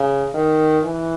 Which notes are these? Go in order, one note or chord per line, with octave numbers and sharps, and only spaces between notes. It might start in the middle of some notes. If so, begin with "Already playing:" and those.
Already playing: C#3
D#3
E3